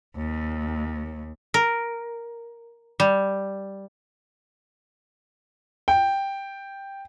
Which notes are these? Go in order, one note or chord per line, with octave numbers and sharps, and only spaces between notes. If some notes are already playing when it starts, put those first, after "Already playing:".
D#2
A#4
G3
G5